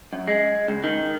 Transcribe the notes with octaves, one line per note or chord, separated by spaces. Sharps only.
F#2
G#3
C#2
D#3